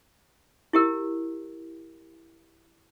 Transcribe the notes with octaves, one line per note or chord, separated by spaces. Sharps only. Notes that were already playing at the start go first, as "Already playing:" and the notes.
E4 G4 A#4